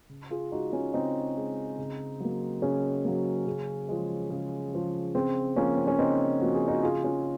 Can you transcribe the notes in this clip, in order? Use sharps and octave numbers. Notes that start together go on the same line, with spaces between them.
C#3
F4 G#4
G#3 D#4 F#4
C#4 F4
C#3 C4 D#4
G#3
C#3
F#3 A#3
C#3 C#4
F#3 A#3
C#3
F3 G#3
C#3
F3 G#3
C#3 C4
F3 A#3 C#4
C4
C#4
C#3 C4 D#4
F3 A#3 F#4
G#4
D#4 F#4
C#3 F4 G#4
C#4 F4